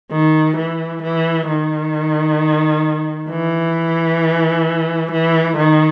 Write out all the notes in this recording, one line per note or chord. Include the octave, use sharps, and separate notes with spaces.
D#3
E3
E3
D#3
E3
E3
D#3